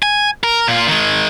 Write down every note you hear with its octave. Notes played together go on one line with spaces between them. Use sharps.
G#5
A#4
A#2 F4
D#3 G#3